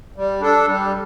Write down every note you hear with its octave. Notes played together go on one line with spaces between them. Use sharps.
G3
D4 A4
G3